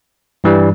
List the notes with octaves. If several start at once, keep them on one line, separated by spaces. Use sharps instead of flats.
G2 E3 G3